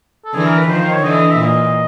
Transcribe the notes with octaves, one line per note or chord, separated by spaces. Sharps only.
A4
D3 E3 G#4
A#4
B4
D#3 F3 C5
C5
C#5
D3 E3 D#5
E5
A#2 D#5